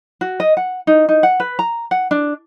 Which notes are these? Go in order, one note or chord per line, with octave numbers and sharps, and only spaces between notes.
F#4
D#5
F#5
D#4
D#4
F#5
B4
A#5
F#5
D4